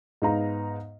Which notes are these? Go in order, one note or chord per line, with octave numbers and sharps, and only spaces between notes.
G#2 B3 D#4 F5 A#5